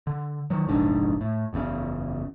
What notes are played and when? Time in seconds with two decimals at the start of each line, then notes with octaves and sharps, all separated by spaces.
0.07 D3
0.50 D#3 F#3
0.67 F1 A#1 G#2 D4
1.21 A2
1.53 F#1 E2 A#2 C#3